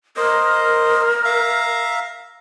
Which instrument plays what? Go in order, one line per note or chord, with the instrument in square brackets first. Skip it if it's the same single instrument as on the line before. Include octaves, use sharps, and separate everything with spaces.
[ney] A#4 [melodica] C5 D#5
[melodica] E5 F5 A#5